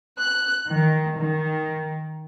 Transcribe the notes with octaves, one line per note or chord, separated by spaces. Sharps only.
F#6
D#3
D#3